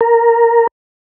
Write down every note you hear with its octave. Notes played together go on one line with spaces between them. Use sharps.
A#4